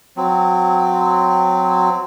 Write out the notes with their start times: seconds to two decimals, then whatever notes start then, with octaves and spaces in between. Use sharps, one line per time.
0.17 F#3 C4